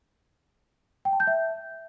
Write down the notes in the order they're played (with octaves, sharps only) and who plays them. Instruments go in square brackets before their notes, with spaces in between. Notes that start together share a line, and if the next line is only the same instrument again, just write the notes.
[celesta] G5
A5
G6
E5